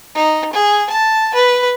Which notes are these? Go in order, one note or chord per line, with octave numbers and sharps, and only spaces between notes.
D#4
G#4
A5
B4